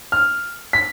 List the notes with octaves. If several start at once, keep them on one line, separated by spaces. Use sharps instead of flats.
F6
B6